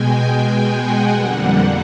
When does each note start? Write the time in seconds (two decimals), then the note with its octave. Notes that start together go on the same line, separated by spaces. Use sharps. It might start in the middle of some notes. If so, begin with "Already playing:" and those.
Already playing: B2 G#3 G5 G#5
0.22 G5
0.66 F#5
1.10 F2 D3 G3 A#3